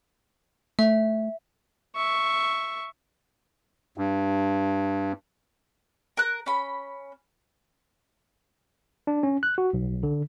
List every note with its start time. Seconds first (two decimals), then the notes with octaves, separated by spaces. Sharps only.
0.79 A3 E5
1.96 E5 C#6
3.98 G2
6.17 A#4 F#6
6.46 C#4 B5
9.07 D4
9.23 C#4
9.43 F#6
9.58 F#4
9.73 B1
10.03 D3